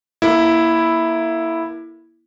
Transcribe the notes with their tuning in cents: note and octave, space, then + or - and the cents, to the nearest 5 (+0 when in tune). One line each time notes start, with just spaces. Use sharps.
A#3 +25 E4 +0 A4 +10